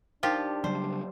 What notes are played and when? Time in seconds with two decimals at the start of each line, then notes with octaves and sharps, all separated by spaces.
0.23 F3 D4 D#4 F4 G4 A#4 C5
0.64 C#3 F#3 G3 C5 D5